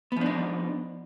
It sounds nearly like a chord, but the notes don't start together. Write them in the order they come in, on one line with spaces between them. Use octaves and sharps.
B3 F3 D4 D#4